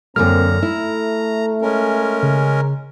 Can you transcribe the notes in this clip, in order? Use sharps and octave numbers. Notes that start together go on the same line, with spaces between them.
F#2 D3 A#3 C4 A#5 F6
A3 E4
G#3 C#4 A#4
C#3